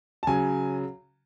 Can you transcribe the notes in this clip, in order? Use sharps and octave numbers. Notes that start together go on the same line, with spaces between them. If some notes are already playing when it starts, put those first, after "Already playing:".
A5
C#3 F#3 G#5